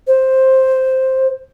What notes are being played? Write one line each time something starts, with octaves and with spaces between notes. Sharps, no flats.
C5